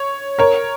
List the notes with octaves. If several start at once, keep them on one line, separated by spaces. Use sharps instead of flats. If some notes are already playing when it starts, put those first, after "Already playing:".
Already playing: C#5
A#4 C#5